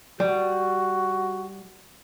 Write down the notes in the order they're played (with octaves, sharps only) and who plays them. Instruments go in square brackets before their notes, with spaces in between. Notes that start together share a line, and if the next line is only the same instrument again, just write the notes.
[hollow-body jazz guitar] G3 [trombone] F#4